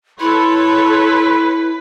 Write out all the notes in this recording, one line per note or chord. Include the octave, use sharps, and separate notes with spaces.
E4 A4 B4 C#5 C6